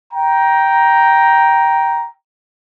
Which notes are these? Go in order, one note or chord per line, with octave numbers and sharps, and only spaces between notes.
G5 A#5